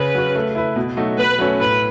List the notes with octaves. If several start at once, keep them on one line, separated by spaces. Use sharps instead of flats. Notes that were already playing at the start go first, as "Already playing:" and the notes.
Already playing: C#3 B4
F#3 C#4
A3
E4 B4
B2
F#3 A3 D#4 F#4
B2 B4
F#3 A3 C#4
A2 B4